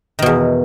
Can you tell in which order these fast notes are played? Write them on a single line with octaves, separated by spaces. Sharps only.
D#3 B2 E2